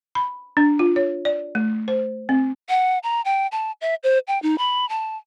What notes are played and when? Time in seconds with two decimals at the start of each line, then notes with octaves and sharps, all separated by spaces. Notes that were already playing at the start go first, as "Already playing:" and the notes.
0.15 B5
0.57 D4
0.79 F4
0.96 C#5
1.25 D5
1.55 A3
1.88 C5
2.29 C4
2.69 F#5
3.03 A#5
3.25 G5
3.52 A5
3.81 E5
4.04 C5
4.28 G5
4.43 D#4
4.58 B5
4.89 A5